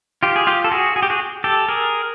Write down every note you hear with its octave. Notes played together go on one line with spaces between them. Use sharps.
F4 G4
G#4
F4 G4
A4
F#4 G#4
G#4
G4
F#4 G#4
G4 A4
G#4 A#4